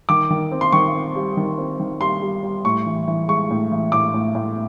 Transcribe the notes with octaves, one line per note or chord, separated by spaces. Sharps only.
D#3 D6
D#3
C4
C6
D#3 C#6
C4
G3
D#3
C4
D#3
G3 C6
G3
G3
A2 C#6
E3
E3
G#3 C#6
A2
E3
A2 D6
A2
A2